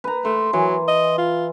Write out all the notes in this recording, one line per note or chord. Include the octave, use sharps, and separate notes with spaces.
B4 A#5
A3 C6
E3 F#3
D#5
F4